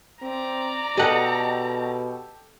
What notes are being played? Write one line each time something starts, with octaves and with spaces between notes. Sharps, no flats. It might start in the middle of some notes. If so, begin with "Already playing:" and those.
C4 D5 A#5
B2 G4 A4 D#5 F#5